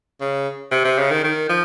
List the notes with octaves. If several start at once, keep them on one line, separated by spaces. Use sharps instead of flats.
C#3
C3
C3
C#3
D#3
D#3
F3